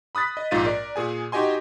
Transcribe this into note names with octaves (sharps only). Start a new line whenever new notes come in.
B5 D#6 F#6 A6 B6
D#5
A#1 G#2 F4 A6 D#7
A#4 D5
A#2 G#4 G#5
D#4 F#4 G4 D#5 G#5 C6